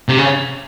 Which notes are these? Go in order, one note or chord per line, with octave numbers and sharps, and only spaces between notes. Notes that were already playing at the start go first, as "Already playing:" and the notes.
C3
C#3